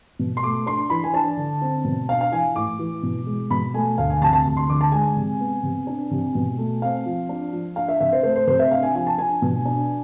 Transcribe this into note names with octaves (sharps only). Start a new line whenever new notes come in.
B2
C6
A3 D6
D4 C6
E3 B5
G#5
D4 A5
D3
C4
B2
D4 F5
F5
E3 G#5
A2 D6
E3
B2
G#3
B2 B5
A3 G#5
D2 F5
G#5
C3 A5
A5
D2
C6
D3 D6
A5
G#3 G#5
C3
B3
C3
D4
C3
B2
A3
C4 F5
F3
D4
F3
D4 F5
E5
C3 E5
C5
A3 C5
C5
C3 C5
E5
D4 F5
G#5
F3 G#5
A5
D4 G#5
B2
D4